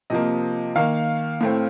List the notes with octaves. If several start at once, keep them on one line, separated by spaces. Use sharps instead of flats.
C3 F3 A#3 D#5
D#3 A#3 F5
A2 A3 C4